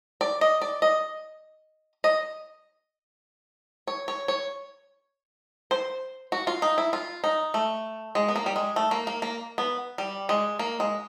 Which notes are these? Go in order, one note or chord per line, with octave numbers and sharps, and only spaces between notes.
D5
D#5
D5
D#5
D#5
C#5
C#5
C#5
C5
F#4
F4
D#4
E4
F4
D#4
A3
G#3
B3
A#3
G3
G#3
A3
A#3
A#3
A#3
B3
G3
G#3
A#3
G#3